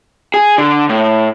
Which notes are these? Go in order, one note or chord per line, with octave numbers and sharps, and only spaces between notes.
G#4
D3
A2